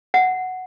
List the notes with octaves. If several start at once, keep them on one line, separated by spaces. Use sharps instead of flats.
F#5